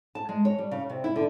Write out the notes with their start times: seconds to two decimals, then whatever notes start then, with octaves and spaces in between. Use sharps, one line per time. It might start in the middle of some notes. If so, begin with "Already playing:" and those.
0.15 A5
0.29 G#3
0.45 C#5
0.58 G3
0.71 C#3
0.89 C3
1.04 E4
1.16 D3